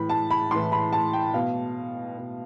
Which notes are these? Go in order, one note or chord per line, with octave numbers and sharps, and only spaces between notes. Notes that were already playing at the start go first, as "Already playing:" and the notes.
Already playing: A2 E3 B5
A5
B5
A2 E3 C6
B5
A5
G5
B2 F5
B2